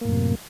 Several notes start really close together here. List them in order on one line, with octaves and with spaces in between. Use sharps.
A#3 A2 F#2 C3